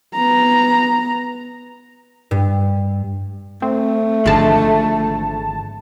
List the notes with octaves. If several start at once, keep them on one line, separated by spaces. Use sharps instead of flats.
B3 A#5
G2
A3 C4
G#1 D3 F3 G#3 A5